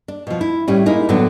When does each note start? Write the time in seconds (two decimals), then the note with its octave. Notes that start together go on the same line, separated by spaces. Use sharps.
0.08 D4
0.27 B2 F3
0.41 E4
0.68 A2 G3 C#4
0.86 G#3 A#3 D#4 E4
1.09 A2 D3 F#3 B3 D4